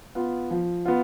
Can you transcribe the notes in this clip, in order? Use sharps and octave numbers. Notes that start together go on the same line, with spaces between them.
B3 F4
F3
B3 F4